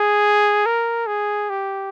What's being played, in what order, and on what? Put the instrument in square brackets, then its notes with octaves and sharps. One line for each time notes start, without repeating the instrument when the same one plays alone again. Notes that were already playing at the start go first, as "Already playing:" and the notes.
Already playing: [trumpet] G#4
A#4
G#4
G4